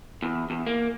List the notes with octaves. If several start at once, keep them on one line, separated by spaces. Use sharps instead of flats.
E2
E2
A#3